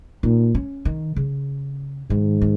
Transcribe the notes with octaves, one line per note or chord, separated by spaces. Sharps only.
A#2 D#4
C#4
D#3
C#3
G#2 D#3
D#3